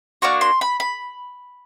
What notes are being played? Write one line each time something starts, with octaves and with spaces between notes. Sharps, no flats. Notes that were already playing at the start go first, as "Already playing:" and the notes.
A#3 D4 F#4 C#6
C6
B5
B5